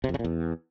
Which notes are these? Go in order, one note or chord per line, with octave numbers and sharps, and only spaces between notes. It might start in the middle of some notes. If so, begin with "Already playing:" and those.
C3
F2
C#3
A#2
E2